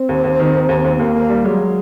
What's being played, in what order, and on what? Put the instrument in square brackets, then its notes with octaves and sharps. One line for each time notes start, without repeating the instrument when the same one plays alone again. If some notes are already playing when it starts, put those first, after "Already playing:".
Already playing: [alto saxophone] C4
[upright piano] D#2
D#2
D#3
D#2
D#2
D#2
[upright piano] D#2 [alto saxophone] A#3
[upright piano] D#2
G3
[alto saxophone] F#3 [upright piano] G#3